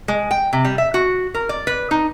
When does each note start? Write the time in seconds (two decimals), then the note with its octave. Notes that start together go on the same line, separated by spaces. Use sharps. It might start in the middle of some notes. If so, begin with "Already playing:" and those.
0.08 G#3
0.31 G5
0.53 C3
0.65 G3
0.78 E5
0.94 F#4
1.34 A#4
1.49 D5
1.67 B4
1.91 D#4